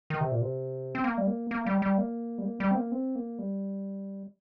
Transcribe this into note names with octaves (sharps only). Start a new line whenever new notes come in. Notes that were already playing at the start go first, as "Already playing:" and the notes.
D#3
C3
A#2
C3
C4
A#3
G3
A#3
A#3
G3
G3
A#3
G3
A#3
G3
C4
A#3
C4
A#3
G3